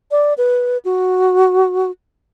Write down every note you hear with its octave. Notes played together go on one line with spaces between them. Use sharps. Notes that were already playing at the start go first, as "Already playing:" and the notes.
D5
B4
F#4